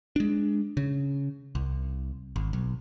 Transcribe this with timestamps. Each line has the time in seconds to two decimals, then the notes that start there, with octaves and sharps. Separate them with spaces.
0.16 G#3 D4
0.77 C#3
1.55 C2
2.36 G#1
2.53 B1